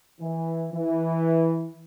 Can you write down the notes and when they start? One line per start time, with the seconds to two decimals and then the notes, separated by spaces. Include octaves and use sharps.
0.20 E3
0.73 E3